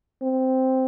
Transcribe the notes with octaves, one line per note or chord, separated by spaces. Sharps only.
C4